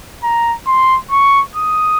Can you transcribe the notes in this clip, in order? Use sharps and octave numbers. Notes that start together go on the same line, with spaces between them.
A#5
C6
C#6
D#6